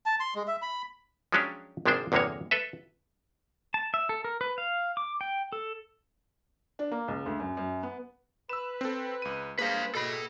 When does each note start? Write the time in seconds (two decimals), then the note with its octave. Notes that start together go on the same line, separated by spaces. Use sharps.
0.06 A5
0.20 C6
0.35 G#3
0.47 E5
0.62 B5
1.32 F3 F#3 G#3 C#4 D4 G4
1.86 G#1 C3 F3 G#3 D4 C5
2.12 G1 E2 C3 G#3 A#3 C#5
2.51 A4 B4 E5
3.74 A5
3.94 E5
4.09 A4
4.24 A#4
4.41 B4
4.58 F5
4.97 D6
5.21 G5
5.52 A4
6.79 D4
6.91 A#3
7.08 C#2
7.26 D2
7.40 F#2
7.57 F#2
7.83 B3
8.49 B4 E6 E7
8.81 C4 A4
9.22 C#2 D#7
9.59 G3 A#3 G#4 B4 C5 F5 B5
9.95 B2 A4 B5